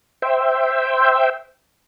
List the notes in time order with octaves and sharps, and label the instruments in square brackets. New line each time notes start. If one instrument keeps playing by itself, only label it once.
[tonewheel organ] C5 E5 G5